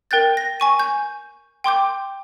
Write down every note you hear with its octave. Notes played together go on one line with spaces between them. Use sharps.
A#4 G5 F#6 G6 A6
A#6
G#5 C#6 D#7
G6
G5 C6 D6 G6